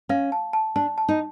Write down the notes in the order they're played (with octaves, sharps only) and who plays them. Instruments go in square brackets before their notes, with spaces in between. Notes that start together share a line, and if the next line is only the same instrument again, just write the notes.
[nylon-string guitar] C#4 [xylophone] F5
[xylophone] A5
A5
[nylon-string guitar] D4 [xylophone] A5
[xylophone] A5
[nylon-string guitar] D#4